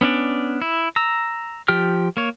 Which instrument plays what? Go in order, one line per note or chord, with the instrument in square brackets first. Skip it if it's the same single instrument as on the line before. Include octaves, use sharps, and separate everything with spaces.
[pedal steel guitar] B3 C#4 D4 D5
E4
A#5 E6
F3 G4 G5 F6
A#3 C#5